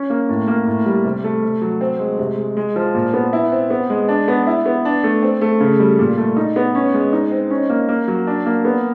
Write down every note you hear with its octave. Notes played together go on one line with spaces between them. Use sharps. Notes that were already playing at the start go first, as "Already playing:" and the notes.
Already playing: C#4
A#3
A2
A#3
A2
G3
C3
A3
C3
F#3
C4
G#3
C3
G#3
G#3
F3
A#2
B3
E4
C4
B3
G#3
D4
B3
E4
B3
D4
A3
C4
A3
C#3
G3
A#2
A3
D#4
B3
C#4
G#3
D#4
C4
C#4
A#3
A#3
F#3
D4
A#3
B3